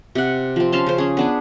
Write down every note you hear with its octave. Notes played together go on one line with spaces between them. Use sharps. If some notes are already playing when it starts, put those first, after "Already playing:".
C3 F#5
F3 C4
C#4 F5 A5 C6
C#3 C5
C#4 G#4
B3 D4 G#4